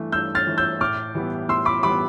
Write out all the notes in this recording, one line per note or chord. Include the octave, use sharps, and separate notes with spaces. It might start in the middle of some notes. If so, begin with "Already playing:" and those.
Already playing: G2 E3 A3
G2 E6 G6
F6 A6
E3 A3
E6 G6
A2 D6 F6
E3 G3 B3
A2 C6 E6
B5 D6
E3 G3 B3 B5 D6